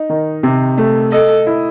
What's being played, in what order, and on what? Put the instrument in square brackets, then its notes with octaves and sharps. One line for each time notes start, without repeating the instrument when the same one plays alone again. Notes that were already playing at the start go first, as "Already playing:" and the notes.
Already playing: [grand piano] D#4
D#3
C3
A3
[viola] A4 [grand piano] D#5
[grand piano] E4